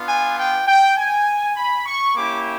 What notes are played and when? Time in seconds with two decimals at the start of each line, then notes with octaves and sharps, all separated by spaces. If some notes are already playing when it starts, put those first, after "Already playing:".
Already playing: B3 D4 F4
0.08 G#5
0.37 G5
0.66 G5
0.97 G#5
1.55 B5
1.86 C#6
2.15 A#3 C#4 E4 G4 D6